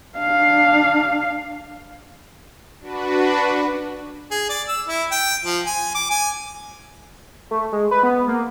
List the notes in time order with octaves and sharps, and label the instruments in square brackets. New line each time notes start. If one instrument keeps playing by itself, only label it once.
[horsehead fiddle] D4 F5
[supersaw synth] D4 F#4 B4
[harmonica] G#4
D5
E6
E4
G5
F3
G#5
D6
G#5
[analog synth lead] A3
G#3
B4
B3
A#3